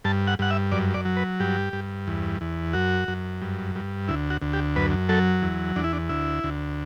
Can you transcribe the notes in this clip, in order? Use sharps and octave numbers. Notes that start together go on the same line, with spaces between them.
G2 A5
F#5
G2 F#5
E5
F#2 D5
D5
F#3
B4
G2 G4
G2
E2
E2
F#2 F#4
F#2
G2
G2
D2 E4
F#4
D2
G4
F#2 B4
F#3 A4
E2
E2 D4
E4
D4
D2 E4
D2